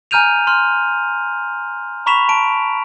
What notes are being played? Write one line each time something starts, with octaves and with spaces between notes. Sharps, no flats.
G#5 A#5 F6 G6 D#7 F7
C6 F6
A#5 B5 C#6 B6 E7 F7
A5 D7